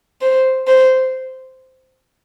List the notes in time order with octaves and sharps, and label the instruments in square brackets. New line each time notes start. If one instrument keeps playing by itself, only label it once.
[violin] C5
C5